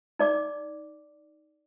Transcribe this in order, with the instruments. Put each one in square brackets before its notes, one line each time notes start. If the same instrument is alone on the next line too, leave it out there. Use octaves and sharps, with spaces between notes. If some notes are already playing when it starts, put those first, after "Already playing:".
[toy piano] D#4 D5 D6